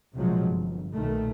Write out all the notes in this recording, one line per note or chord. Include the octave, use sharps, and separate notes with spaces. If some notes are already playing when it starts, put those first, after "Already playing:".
A#1 C3 F3 F#3 G#3
G1
B1 A#2 D#3 A3